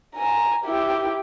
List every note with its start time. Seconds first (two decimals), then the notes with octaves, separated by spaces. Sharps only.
0.16 G#5 A#5
0.64 E4 G4